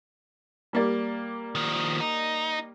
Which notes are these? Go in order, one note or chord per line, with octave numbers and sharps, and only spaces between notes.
G3 A#3 D5
D#3 F3
D#4